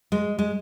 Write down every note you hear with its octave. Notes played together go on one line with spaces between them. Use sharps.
G#3
G#3